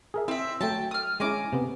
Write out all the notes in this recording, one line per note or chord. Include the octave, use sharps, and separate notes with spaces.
G#4 A#4 E5
C4 E4 E5
F#3 A3 G5 A5
D#6 F6
G#3 C#4 E4 G#5 A#5 D6
C3 B3